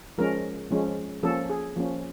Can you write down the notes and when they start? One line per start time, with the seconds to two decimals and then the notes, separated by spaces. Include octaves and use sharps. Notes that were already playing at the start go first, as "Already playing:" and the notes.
0.18 F3 G#3 C#4 A#4
0.71 F3 G#3 C#4
1.23 F3 A#3 C#4 A4
1.49 G#4
1.76 F3 A#3 C#4